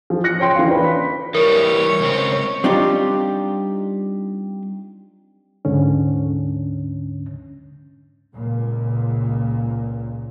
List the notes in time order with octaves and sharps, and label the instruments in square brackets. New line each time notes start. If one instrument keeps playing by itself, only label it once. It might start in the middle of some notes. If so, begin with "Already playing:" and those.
[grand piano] F3
F#6 A#6 C#7
C#5 G5 C6
E3 F4
D4 B4
B6
[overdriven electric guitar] E3 G3 [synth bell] A#4 [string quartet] C#5
[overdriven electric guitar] C#2 C4
[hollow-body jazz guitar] G3 C4 D4 D#4 F4 G4
[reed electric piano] D2 G#2 D3 C#4
[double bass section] C#2 A#2